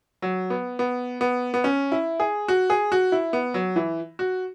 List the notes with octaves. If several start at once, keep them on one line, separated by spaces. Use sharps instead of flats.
F#3
B3
B3
B3
B3
C#4
E4
G#4
F#4
G#4
F#4
E4
B3
F#3
E3
F#4